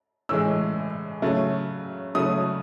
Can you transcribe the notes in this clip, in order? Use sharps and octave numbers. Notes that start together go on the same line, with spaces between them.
A2 E3 G#3 E6
C#3 F#3 A3
C#3 F#3 A3 D#6